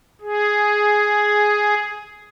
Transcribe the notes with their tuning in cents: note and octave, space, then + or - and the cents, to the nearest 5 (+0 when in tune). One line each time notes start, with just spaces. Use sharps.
G#4 +5